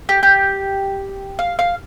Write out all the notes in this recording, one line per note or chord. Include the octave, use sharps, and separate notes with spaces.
G4
G4
F5
F5